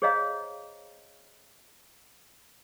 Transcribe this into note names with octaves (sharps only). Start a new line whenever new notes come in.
G#4 C5 C#5 D#5 F5 A#5